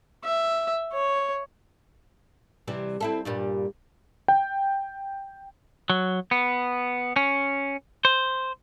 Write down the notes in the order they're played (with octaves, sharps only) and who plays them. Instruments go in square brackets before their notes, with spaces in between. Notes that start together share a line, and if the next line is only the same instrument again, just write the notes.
[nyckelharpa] E5
C#5
[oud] C3 E3 G3
C4 E4 A4
G2 A#2 G3
[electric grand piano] G5
[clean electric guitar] F#3
B3
C#4
C5